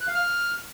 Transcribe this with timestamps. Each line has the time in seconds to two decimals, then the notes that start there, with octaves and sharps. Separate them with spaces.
0.01 F#6
0.08 F5
0.15 F6